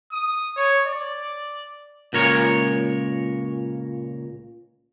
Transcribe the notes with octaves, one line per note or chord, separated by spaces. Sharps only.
D#6
C#5
D5
C#2 A#2 A#4 C#5